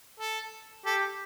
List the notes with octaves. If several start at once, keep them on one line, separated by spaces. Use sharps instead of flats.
A4
G4 A4